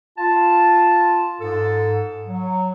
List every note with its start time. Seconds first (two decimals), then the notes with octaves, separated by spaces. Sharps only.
0.18 F4 A5
1.41 G#2 A4
2.27 F#3